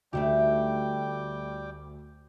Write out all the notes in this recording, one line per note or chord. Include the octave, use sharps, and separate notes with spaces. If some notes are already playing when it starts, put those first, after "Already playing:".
D2 G3 A3 D#4 G4 G5 D6